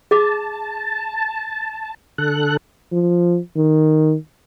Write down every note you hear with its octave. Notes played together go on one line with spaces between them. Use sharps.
G#4 A5 D6
D3 A4 F#6
F3
D#3